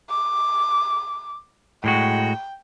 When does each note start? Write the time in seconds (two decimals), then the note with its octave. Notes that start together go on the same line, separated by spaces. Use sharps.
0.10 D6
1.84 A2 G#3 F#4 G5